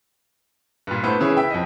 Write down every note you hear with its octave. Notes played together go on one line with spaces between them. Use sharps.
G2 A#2
A3 B3 E4 C5
C#3 E3 E4 G#4 C#5
E5 G5
F2 D#5